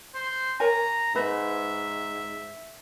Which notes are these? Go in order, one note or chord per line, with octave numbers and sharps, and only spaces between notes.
C5
A#4 C#5 G#5 A#5
G#2 B4 E5 B5